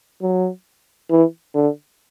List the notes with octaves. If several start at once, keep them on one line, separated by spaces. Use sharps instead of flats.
F#3
E3
D3